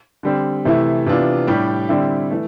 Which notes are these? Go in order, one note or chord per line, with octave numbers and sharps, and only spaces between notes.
D3 G3 C4
C3 E3 A3 E4
C3 E3 B3 D4 F4
A2 G3 D4 G4
D3 G3 C4 E4
E3 A3